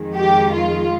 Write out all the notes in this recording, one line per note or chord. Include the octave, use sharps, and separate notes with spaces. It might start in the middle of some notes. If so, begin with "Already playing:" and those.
Already playing: F2 D#3 G#3
G4
F4